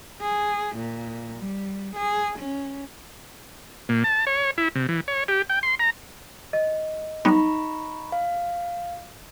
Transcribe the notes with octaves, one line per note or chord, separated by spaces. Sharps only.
G#4
A#2
G3
G#4
C#4
A#2
A5
C#5
E4
C3
E3
C#5
G4
G5
C6
A#5
D#5
F#3 G3 B3 D#4 A#5 B5 C#6
F5